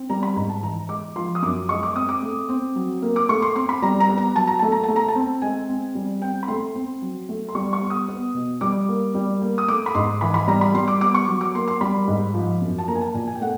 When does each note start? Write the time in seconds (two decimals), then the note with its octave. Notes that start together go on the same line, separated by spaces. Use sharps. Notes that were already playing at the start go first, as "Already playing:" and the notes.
Already playing: C4
0.09 G3 A#5
0.23 B5
0.36 G#2 A#5
0.49 A5
0.63 E3 A#5
0.89 G#3 D6
1.16 F3 C6
1.35 D#6
1.42 F#2 D6
1.69 G#3 C#6
1.83 D6
1.96 C4 D#6
2.09 D6
2.23 A3
2.49 C4
2.76 F#3
3.02 A#3
3.16 D6
3.29 A3 C#6
3.42 C6
3.56 C4 C6
3.69 B5
3.82 G3 A#5
4.00 A#5
4.09 B3
4.18 A#5
4.35 F#3 A5
4.47 A#5
4.59 A3 A5
4.72 A#5
4.83 A5
4.88 A3
4.96 A#5
5.08 A5
5.15 C4
5.42 G#3 G#5
5.69 C4
5.95 G3
6.22 C4 G5
6.43 B5
6.48 A3 C6
6.75 C4
7.02 F#3
7.29 A3
7.49 C6
7.55 G3 C#6
7.73 C#6
7.81 B3
7.90 D#6
8.08 B3
8.35 B2
8.61 G3 D6
8.89 A#3
9.15 G3
9.42 A#3
9.58 D#6
9.68 A3 D6
9.86 B5
9.95 G#2 C6
10.21 E3 B5
10.34 B5
10.48 G3 A#5
10.61 B5
10.74 G3 C6
10.88 D6
11.01 B3 D6
11.14 C#6
11.28 F#3
11.41 D6
11.55 A#3 C6
11.68 C6
11.81 G3 B5
12.08 G#2
12.34 F3
12.61 F#2
12.78 A5
12.88 A#3 A#5
12.95 G#5
13.01 A5
13.14 A#2 G#5
13.27 G#5
13.35 G5
13.41 A3 F#5